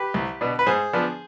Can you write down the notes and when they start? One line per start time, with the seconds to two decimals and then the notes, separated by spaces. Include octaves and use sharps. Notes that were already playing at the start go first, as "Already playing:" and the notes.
Already playing: G4 B4
0.14 C2
0.41 B2 B3 D4
0.59 B4
0.66 G#2 G#4 C5
0.93 F3 B3 D4